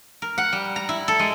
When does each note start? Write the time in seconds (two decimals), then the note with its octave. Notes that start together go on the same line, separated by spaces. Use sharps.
0.22 A#4
0.38 F#5
0.53 G3
0.76 A#5
0.89 E4
1.08 A4
1.19 G#3